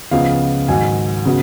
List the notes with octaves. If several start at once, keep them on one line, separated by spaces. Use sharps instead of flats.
C#2 C#3 F3 B3 F5
G#2 D#3 F#3 G#5
C#3 F#3 B3